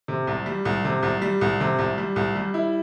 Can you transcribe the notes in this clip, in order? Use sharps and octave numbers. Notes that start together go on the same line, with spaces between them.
C3
C2
G3
C2
C3
C2
G3
C2
C3
C2
G3
C2
G3
E4